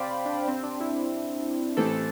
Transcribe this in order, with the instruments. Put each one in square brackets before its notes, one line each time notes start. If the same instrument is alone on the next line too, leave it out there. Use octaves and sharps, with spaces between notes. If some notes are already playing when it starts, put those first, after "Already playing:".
Already playing: [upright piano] C3 [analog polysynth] C5 D5 F5 G5 B5
[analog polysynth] D4
C4
D4
E4
[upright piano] A1 A2 E3 A3 C4 [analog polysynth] A4